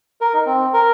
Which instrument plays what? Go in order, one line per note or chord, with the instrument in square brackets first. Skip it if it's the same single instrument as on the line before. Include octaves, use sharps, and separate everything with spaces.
[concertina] A#4
D#4
C4
A#4